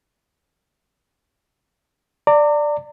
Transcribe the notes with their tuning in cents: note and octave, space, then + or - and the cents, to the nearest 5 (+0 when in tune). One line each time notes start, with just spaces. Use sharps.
D5 +5 A#5 -40